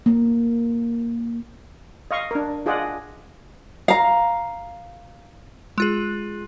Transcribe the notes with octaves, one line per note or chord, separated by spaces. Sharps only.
A#3
D#5 F5 C#6
D4 A#4
F4 G#4 D5 D#5 F#5
F5 A#5
G#3 F4 G#4